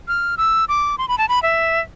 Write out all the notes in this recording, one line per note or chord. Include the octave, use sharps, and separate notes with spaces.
F6
E6
D6
C6
B5
A5
B5
E5